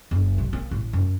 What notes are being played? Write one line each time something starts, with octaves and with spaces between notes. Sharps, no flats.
F#1
B1
A#3
A1
F#2